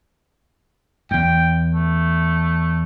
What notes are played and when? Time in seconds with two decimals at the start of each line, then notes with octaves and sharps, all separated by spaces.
1.11 E2 G#2 G5
1.72 A3